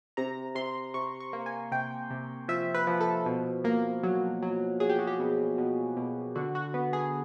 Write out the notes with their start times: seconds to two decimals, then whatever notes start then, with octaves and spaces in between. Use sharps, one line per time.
0.17 C3 A#5
0.55 C3 C6
0.94 C3 C#6
1.20 C#6
1.33 A#3
1.46 G#5
1.72 C3 G5
2.10 C3
2.48 F3 E5
2.75 B4
2.87 F3
3.01 A4
3.26 B2
3.64 A#3
4.03 F#3
4.42 F#3
4.80 F#3 G#4
4.90 G4
4.99 F#4
5.07 G4
5.19 B2
5.58 B2
5.97 B2
6.36 D3 F#4
6.55 F#4
6.74 B3
6.93 G#4